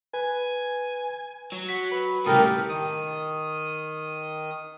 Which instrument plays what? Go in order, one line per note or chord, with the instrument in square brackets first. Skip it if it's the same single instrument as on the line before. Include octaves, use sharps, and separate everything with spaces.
[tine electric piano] B4 [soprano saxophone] G#5
[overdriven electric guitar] F#3
[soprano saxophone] F#4 [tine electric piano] B6
[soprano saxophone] B4
[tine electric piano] C2 D#6 [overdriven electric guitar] A2 C#3 [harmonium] G4 A#4 [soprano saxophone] A4
[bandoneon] D#3 D#6